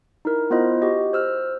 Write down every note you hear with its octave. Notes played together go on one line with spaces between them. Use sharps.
D#4 E4 A#4
B3 E4 F4 C5 D#5
F#4 G4 D#5
C5 E6 F6